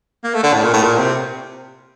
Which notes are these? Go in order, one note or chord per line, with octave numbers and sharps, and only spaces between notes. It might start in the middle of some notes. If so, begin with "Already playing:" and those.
A#3
A3
D3
A2
A#2
A2
A#2
C3